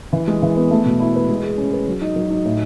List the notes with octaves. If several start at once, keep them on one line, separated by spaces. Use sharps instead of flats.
E3
G#3
E3
B3
A3
B2
E4
B4
G#3
G#4
C#4
B4
F#3
D#4
F#3
D#4
A2